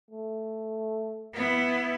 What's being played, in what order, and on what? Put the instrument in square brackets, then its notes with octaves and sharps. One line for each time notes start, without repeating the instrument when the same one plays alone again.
[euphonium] A3
[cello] B3 E4